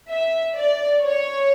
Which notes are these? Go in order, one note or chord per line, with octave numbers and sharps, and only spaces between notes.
E5
D5
C#5